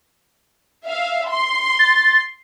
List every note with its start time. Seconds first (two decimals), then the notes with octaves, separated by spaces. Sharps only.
0.86 E5 F5
1.30 C6
1.79 A6